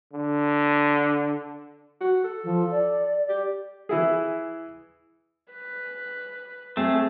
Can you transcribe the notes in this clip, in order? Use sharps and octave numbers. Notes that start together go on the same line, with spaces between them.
D3
F#4
A4
F3
D5
G4
E3 E4 G#4
B4
A3 C4 G#4